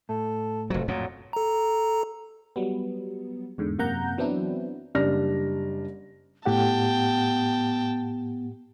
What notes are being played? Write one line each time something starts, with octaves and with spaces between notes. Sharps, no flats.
A2 A4
F1 F2 F#3
F2 A#2 F#3
A4 A#5
F#3 G3 B3
E2 G#2 D3
F#2 C3 A#3 F#5 A#5 G6
E3 F#3 B3 C4 D4 E4
F#1 G3 D4 G4 F6 A#6
A2 B3 G4 F#5 G5 A5